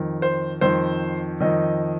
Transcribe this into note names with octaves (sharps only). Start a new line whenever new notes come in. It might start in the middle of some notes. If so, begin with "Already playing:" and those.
Already playing: F2 D#3
C5
F2 D#3 C5
F2 D#3 D#5